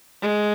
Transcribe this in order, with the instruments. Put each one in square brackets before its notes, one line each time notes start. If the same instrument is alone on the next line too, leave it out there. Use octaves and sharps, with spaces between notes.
[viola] G#3